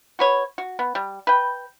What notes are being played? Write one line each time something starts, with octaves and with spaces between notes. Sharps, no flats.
F#4 B4 C#5
F#4
B3
G3
B4 G5